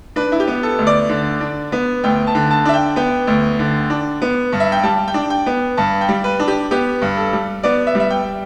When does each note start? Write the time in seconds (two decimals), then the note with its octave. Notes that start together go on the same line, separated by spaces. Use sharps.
0.16 D4 B4
0.32 E4
0.40 G4
0.47 B3
0.63 A4
0.79 D2
0.87 D5
1.09 D3
1.41 D4
1.72 B3
2.04 D2 G5
2.27 A5
2.35 D3
2.51 A5
2.65 D4 E5
2.74 G5
2.96 B3 G5
3.27 D2
3.59 D3
3.90 D4
4.22 B3
4.53 G2
4.60 E5
4.72 G5
4.83 G3 A5
5.08 G5
5.14 D4
5.30 G5
5.46 B3
5.77 G2 A5
6.01 G5
6.09 G3
6.24 B4
6.40 D4
6.48 G4
6.71 B3 G4
7.02 G2
7.17 A4
7.33 G3
7.63 B3 D5
7.87 E5
7.95 G3
8.00 E5
8.10 G5